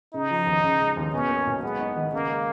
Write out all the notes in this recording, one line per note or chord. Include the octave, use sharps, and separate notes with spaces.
C#3 D#4
F3
D#2
C#3
G#3
D#2
B2 C#4
A#3
B1
G#3 B3
D#4
D#3
C#3 A#3
G#3